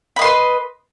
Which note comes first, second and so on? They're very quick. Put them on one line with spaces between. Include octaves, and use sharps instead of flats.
B5 D#5 C6 B4